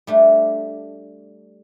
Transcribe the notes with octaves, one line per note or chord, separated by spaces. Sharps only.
G3 A3 D4